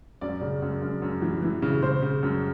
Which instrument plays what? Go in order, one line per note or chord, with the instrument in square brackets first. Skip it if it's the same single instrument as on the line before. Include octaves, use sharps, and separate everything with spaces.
[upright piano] F#2 D5
C#3
F#2
F#2
F#2
E3
E3
C#3
C#3 C5
C#3
F#2